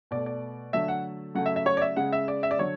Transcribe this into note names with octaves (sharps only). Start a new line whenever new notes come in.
B2 A3 D5
D5
D3 F#3 A3 E5
F#5
C#3 F#3 A3 F#5
E5
E5
C#5
D5
E5
C#3 G#3 F#5
E5
D5
E5
D5
D3 F#3 C#5